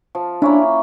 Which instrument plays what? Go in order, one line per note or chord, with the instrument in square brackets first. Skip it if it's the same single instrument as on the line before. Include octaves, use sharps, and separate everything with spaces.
[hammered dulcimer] F3
[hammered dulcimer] A#3 C#4 E4 [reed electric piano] D4